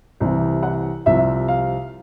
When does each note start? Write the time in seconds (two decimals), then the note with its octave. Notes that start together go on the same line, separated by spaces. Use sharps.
0.20 C2 C3 E3
0.63 F#5
1.06 C2 C3 F3 E5
1.48 F5